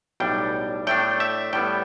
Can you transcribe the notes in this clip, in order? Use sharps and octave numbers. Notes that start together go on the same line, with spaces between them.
B1 A2 G3 D4 G5
A2 A3 D4 G5
E5
A2 G3 B3 G5